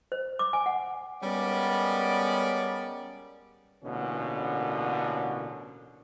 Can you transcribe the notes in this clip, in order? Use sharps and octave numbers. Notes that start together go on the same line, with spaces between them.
C5
D6
G#5
F#5
G3 G#3 B3 C#4 A#4 D5
A1 B2 D3 A#3 C#4